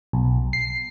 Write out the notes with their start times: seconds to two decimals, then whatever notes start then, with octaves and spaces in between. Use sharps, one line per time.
0.13 B1
0.53 C7